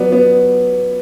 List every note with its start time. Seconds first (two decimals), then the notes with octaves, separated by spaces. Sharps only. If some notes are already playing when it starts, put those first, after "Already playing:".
Already playing: F#3 B3 D5
0.12 B3